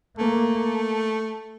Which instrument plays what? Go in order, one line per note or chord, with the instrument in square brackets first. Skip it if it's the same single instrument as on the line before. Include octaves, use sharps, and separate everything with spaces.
[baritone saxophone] A3 [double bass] A#3